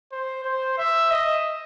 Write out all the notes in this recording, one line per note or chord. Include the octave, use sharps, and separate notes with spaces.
C5
C5
E5
D#5